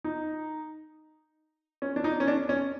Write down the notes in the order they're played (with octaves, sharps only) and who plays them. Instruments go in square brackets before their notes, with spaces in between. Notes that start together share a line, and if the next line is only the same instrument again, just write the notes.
[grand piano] D#4
C#4
D4
D#4
C#4
D4
C#4